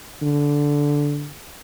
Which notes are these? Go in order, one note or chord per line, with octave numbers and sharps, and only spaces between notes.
D3